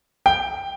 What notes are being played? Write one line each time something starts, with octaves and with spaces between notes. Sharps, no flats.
G5